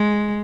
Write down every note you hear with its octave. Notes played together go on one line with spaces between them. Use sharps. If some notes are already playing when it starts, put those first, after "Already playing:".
Already playing: G#3